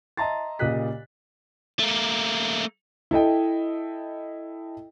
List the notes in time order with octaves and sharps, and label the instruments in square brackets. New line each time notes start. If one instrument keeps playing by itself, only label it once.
[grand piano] D#5 E5 A5 A#5 C6 A6
A#2 C#3 G4 D#5 F#6 B6
[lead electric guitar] A3 A#3
[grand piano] E4 A4 D#5 G5